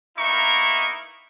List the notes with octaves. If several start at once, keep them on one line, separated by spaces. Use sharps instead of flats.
A#3 B3 D#4 E4 A#5 C#6